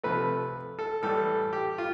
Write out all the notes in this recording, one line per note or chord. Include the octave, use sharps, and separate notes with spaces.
C3 F3 A3 B4
A4
A2 E3 G3 A4
G4
F4